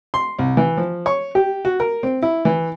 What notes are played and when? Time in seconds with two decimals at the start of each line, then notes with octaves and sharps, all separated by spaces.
0.14 C6
0.39 C2
0.57 E3
0.77 F3
1.06 C#5
1.35 G4
1.65 F#4
1.80 A#4
2.03 C4
2.22 E4
2.45 E3